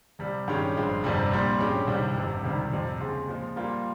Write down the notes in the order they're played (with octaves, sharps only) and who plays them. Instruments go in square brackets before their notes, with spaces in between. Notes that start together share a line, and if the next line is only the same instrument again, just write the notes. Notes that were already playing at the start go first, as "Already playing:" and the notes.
[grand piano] C2 C3 G3
G2 D#3 G#3 C#4 G4
G#1 G2 F3 G#3
G1 F2 C3 G3
A#1 A#2 G3 C4
G2 F3 G#3 C#4 G4
C2 C3 D#3 G3
G1 F2 C3
C#2 C3 D#3 G3
F2 C3 F3
D#2 C#3 G#3 C4
A#2 F3 G#3
A#2 G3 A#3 F4